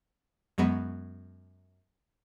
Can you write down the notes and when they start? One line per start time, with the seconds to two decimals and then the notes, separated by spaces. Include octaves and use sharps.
0.58 F#2 F#3 G#3 B3